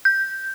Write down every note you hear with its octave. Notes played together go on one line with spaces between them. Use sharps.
G6